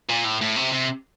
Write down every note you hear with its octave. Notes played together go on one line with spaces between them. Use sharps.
A#2
A2
A2
C3
C3